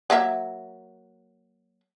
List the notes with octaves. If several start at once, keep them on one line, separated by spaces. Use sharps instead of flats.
F#3 A#3 E5